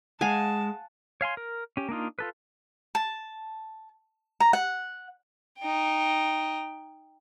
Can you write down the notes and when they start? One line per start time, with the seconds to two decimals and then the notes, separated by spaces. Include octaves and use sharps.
0.21 G#3 F5 F#5 G#5 A5
1.21 C#5 F5 G#5 C6
1.37 A#4
1.77 C#4 G4
1.89 A#3 D4 D#4 F4
2.19 F4 A4 B4
2.95 A5
4.40 A#5
4.53 F#5
5.59 D#4 G5